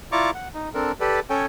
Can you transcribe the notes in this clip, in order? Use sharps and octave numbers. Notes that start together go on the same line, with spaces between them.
E4 F4 D5 A#5 C#6 D6
F#5
D#4
C4 D4 A4 A#4
G4 A4 B4 D5
C#4 A4 C#5 G5 G#5